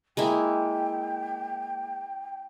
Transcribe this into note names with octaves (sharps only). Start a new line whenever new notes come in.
G#3 A#3 E4 G5